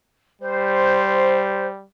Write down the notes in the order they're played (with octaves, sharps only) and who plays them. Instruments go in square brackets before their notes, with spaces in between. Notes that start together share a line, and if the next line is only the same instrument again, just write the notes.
[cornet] G3 [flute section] C5